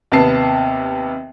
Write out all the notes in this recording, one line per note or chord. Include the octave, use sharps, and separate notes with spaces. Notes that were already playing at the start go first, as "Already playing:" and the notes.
D#2 C3 B3 A5 C7